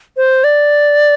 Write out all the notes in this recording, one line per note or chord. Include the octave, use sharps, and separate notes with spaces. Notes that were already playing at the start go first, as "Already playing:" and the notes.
C5
D5